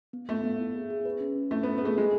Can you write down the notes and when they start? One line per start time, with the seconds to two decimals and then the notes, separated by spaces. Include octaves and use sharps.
0.13 B3
0.29 A3 B3
0.44 B3
0.60 E4
0.75 G#4
0.90 G#4
1.05 B4
1.21 C#4
1.36 C#4
1.51 A3 E4
1.63 B3 E4
1.78 B3
1.82 A3 G#4
1.97 G#3 A3